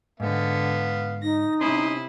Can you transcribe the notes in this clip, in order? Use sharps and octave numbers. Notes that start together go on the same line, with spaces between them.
G#2 D3 B3 F5
D#4 A#6
C3 C#4 E4 B5 C6 D#6